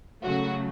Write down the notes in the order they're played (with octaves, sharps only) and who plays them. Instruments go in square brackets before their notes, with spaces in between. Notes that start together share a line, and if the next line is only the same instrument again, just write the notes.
[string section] C#3 F#3 A3 F#4